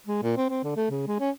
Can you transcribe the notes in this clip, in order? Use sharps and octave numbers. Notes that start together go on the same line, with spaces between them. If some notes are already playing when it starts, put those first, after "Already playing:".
G#3
A#2
C4
C4
D3
A3
C#3
G#3
C#4